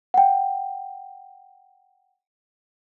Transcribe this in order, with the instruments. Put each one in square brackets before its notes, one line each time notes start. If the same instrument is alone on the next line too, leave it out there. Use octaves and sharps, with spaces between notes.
[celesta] F#5 G5